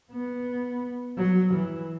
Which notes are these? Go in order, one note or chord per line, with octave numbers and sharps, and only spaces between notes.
B3
F#3
E3